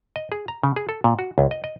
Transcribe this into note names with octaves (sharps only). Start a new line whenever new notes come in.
D#5
G#4
A#5
C#3
G#4
A4
A#2
F#4
C#2
D#5
D#5